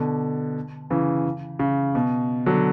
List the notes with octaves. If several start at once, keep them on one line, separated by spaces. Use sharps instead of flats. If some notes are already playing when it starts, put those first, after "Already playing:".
Already playing: B2 D3
C#3 E3
C#3
B2
D3 F#3